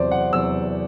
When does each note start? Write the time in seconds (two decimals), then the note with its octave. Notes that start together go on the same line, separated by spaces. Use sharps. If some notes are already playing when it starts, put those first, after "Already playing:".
Already playing: E2 C3 F#3 C5 D5
0.11 F#5
0.33 E2 C3 F#3 E6